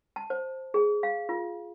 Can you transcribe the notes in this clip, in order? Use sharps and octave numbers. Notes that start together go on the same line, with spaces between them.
A5
C5
G#4
F5
F4